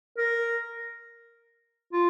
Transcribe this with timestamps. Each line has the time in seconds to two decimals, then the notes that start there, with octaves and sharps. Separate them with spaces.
0.18 A#4
1.93 F4